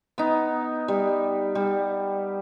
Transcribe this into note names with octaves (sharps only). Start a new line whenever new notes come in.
B3 D#4
G3
G3